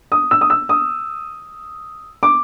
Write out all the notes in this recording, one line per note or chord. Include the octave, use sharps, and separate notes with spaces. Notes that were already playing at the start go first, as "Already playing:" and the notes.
D#6
E6
D#6
E6
D#6
D6